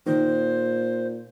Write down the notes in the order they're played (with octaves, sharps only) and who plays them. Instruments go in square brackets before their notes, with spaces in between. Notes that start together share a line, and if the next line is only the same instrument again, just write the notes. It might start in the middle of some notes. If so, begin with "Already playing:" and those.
[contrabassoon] A#2 [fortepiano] D#3 [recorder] C5